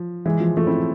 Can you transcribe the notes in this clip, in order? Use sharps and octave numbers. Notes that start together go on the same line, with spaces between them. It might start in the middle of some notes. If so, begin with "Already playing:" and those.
Already playing: F3
E3 G#3
F3
F3 A3
C4 E4